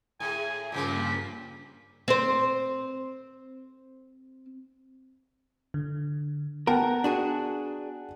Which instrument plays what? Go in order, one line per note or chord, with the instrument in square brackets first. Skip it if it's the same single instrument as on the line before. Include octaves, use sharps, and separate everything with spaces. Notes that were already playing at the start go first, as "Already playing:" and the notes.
[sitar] A2 [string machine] G#4 [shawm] G#5
[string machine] G2 A#3 B6 [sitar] A#2 C#3 F3 [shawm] G4
[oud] C4 C5
[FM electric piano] D3
[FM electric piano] B3 [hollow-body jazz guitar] A#4 [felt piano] F#5 G5 A5
[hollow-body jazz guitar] D4 F#4 G#4